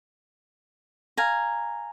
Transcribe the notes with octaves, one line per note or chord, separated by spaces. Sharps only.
F5 G#5 A#5